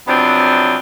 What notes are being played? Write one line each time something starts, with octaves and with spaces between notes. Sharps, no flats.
C3 F3 F#3 B3 C4 D4